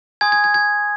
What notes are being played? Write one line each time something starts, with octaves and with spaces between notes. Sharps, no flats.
G#5 C6 D#6 G6 G#6
G#6
G#6
G#6